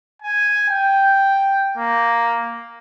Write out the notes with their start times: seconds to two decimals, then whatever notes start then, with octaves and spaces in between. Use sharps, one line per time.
0.22 G#5
0.70 G5
1.78 A#3